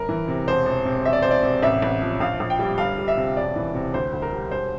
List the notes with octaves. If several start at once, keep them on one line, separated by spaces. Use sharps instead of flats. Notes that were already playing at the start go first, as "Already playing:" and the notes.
Already playing: G1 A#4
E3
C3
E1 C5
E1
C3
E1 E5
D5
E1 C5
D5
C3
A1 E5
A1
F3
A#1 F5
A#1
G5
G3
G1 F5
G3
E5
C3
E1 D5
E3
C3
D2 C5
D2
A#4
G3
E1 C5